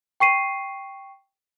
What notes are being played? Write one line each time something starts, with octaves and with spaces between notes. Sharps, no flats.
G5 C#6 C7 D#7